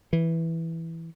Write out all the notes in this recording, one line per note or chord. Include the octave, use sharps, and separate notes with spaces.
E3